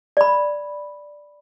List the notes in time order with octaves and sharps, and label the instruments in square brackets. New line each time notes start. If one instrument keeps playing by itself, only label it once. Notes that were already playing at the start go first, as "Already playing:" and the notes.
[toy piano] D5 B5